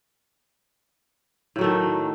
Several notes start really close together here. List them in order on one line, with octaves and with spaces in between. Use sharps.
A2 F#3 A3 D#3